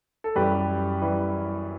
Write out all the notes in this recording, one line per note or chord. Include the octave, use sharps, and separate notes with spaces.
A4
F#2 E3 G3 G4 B4
E3 G3